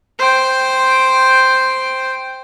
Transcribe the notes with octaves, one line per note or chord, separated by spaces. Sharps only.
C5 G5